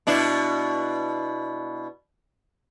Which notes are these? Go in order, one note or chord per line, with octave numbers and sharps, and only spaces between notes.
B2 D4 E4